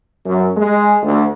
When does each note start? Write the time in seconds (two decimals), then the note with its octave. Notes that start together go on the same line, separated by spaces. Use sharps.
0.25 F#2
0.57 G#3
1.03 D2